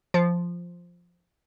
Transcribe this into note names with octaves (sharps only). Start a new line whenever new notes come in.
F3